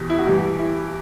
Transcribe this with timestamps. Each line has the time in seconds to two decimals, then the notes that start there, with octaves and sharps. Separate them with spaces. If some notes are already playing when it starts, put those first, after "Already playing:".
Already playing: E2 B2 G4
0.10 E4
0.19 F#4
0.27 G2 E3 G4
0.59 E4